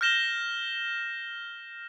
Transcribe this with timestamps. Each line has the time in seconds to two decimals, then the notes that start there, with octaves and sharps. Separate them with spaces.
0.01 F6 G6 A#6 E7 G7